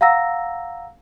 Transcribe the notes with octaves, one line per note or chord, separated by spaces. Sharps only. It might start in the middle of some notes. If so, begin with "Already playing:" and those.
F5 F#5 A#5 E6 A#6